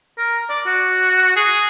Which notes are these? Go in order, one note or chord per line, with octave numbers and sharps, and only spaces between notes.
A#4
D5
F#4
G#4